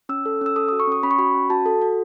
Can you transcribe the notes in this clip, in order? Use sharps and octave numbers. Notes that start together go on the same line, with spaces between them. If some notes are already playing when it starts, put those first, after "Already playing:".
C#4 E6
A4
C#4 E6
A4 D#6
D#6
F#4
C#6
C#4 D#6
C#4 B5
C#6
F#4 B5
C#4
F#4 A5
A4
F#4